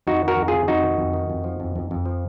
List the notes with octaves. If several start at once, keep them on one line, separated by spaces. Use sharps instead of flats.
F2 D#4 F#4
D#3
F#4 A#4
F2
C3 F4 G#4
F2 D#4 F#4
D#3
F2
D#3
F2
F3
F2
F2
F2
F3